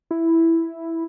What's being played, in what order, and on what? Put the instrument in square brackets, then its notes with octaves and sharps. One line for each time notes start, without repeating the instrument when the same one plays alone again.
[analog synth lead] E4